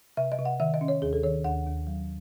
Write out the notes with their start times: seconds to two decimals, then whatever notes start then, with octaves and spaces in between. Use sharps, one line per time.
0.17 C3 E5
0.32 D#5
0.39 C3
0.45 F#5
0.60 D#3 E5
0.74 D#5
0.81 C#4
0.88 C#5
1.02 D#2 G#4
1.13 A4
1.23 D#3 C#5
1.44 D#2 F#5
1.66 D#2
1.87 F#3